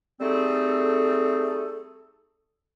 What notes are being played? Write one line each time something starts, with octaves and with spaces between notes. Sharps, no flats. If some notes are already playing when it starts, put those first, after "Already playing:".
G3 A3 C4 D#4 G#4 A4